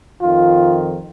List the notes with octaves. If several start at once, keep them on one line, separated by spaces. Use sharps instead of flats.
F2 D#3 F4